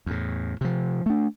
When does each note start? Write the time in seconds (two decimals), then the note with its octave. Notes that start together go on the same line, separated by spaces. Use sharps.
0.06 E2 A2
0.61 C3 F3
1.06 A3 D4